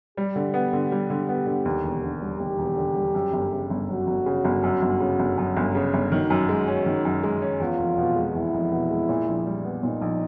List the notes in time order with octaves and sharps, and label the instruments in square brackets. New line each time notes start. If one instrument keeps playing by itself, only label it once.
[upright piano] G3 [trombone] G4
[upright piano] D3
B3
D3
G3
D3
B3
D3
D#2
E1
D3
G3
[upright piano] D#2 [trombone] G4
[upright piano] E1
D3
G3
F#2
G1
C#3
G1
[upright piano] F#2 [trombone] F#4
[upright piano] G1
C#3
G1
F#2
G1
C#3
G1
F#2
G1
C#3
G1
[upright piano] D#3 [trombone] F#4
[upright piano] F#2
G#3
C#4
D#3
F#2
G#3
C#4
[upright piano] E2 [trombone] F4
[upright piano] F1
B2
G#3
[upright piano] E2 [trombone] E4
[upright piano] F1
B2
G#3
A#2
A#1
G3
B3
[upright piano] A#2 [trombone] D#4
[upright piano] A#1